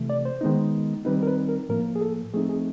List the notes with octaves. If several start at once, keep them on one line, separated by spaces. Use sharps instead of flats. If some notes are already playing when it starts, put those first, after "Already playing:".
Already playing: C3 E3 A3
D5
C5
D#3 G#3 B3 D#4
D#3 G3 C4 D#4 B4
A#4
B4
A#4
A2 F3 A#3 A#4
G#4
A4
F3 A3 C4 D#4 G#4
G#4